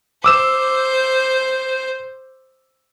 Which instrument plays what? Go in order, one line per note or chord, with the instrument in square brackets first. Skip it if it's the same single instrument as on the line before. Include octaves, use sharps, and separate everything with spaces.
[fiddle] C5 [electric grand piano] D6 E6 E7